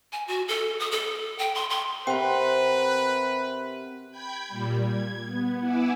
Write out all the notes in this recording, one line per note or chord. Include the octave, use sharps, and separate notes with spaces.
G#5
F#4
A4
D#6
A4
G5
C6
C6
C3 A#4 B4 F#5 G5 C6
G5 B5 G6 G#6 B6
A#2 G3
G#6
B3
E4 F#5 G#5 D6 E6